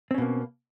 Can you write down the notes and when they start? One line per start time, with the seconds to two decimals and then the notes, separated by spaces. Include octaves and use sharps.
0.11 C4
0.14 C#4
0.18 B2
0.22 A#3